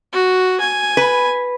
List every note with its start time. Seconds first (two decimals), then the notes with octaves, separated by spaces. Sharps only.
0.13 F#4
0.60 G#5
0.97 B4